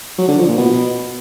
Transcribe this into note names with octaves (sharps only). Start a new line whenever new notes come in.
F#3
D3
F3
A#2
B2